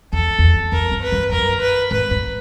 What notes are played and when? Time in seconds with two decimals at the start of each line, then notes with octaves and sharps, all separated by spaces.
0.13 E2 A4
0.39 E2
0.72 F2 A#4
0.91 G2
1.03 B4
1.12 G2
1.32 F#2 A#4
1.61 B4
1.91 G#2 B4
2.11 G2